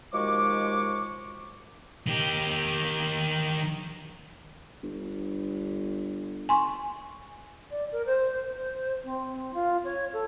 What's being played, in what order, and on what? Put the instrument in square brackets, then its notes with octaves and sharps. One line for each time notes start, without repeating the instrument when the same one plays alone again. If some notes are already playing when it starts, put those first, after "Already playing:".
[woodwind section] D#2 F3 G#3 F#4 C#6 D6
[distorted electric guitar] D#3 G4
[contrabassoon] G1
[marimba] G#5 C6 C#6
[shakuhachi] D5
A#4
C5
C5
C4
C4
F4
C#5
A4